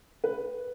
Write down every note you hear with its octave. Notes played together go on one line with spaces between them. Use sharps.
B4